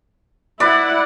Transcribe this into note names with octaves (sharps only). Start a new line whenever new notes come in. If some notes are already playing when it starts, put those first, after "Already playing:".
E4 B4 D5 F#5